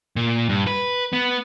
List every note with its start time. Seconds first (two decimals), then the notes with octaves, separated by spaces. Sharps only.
0.16 A#2
0.49 G2
0.67 B4
1.13 B3